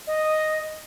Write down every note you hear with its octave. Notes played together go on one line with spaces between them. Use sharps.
D#5